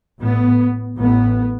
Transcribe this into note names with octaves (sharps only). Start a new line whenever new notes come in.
A1 A2 B3
A1 A2 B3